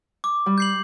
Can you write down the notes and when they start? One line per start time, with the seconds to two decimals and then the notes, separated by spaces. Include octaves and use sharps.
0.24 D6
0.46 G3
0.58 G6 C7 F#7